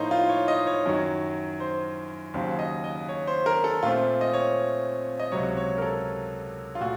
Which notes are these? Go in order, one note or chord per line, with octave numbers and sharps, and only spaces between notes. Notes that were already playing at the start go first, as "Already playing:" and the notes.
Already playing: A2 F3 A#3 D#4 C5 C#5
F4
C#5
D#5
C#5
F#2 D#3 F#3
C5
D#2 C#3 F#3 C5
D#5
D#5
C#5
C5
A#4
A4
A#2 A3 C4 F4
D#5
C#5
D#5
C#2 C3 F#3 C#5
C#5
A#4
A4
F4
A#2 A3 F#4